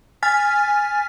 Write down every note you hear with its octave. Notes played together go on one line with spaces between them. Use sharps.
G#5 F6 A6 B6